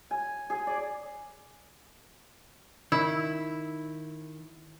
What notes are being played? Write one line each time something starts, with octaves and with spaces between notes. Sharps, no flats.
G#5
G#4
D5
D#3 E4